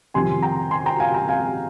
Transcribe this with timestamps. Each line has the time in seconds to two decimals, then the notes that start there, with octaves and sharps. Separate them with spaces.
0.14 F2 C3 D#3 G3 G#5 C6
0.42 G5 A#5
0.71 G#5 C6
0.86 G5 A#5
1.00 F5 G#5
1.14 G5 A#5
1.28 F5 G#5